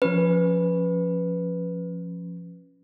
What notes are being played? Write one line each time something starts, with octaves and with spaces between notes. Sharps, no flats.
F3 C#4 B4